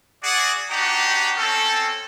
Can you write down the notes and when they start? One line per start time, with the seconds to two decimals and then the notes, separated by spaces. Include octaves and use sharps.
0.23 F#4 G#4 D5
0.71 D4 D#4 F#4 G4 F#5 A#5
1.37 C4 C#4 A4